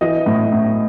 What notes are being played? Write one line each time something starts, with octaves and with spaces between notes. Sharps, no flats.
E3 D#5
A2
A2